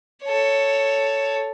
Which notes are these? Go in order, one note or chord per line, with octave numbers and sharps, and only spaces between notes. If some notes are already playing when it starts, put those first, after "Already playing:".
A4 C#5